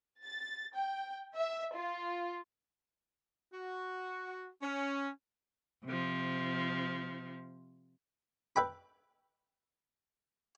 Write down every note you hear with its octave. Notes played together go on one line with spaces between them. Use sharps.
A6
G5
E5
F4
F#4
C#4
C3 F3
B4 E5 G5 B5